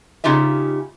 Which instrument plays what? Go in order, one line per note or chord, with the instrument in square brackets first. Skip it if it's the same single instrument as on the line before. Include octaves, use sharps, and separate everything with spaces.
[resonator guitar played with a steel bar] C#3 D#4 F4 G4 E5